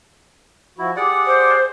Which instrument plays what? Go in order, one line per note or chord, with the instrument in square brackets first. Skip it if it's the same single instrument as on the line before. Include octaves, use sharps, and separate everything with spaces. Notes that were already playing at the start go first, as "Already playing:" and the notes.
[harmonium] F3 F#4 [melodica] E4
[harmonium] G4 G#4 [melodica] D5 F#5
[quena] C5